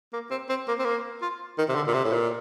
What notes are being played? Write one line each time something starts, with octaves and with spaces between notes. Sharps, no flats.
A#3
C4
C4
A#3
C4
A#3
F4
D#3
C3
D3
A#2
C3
A2
A#2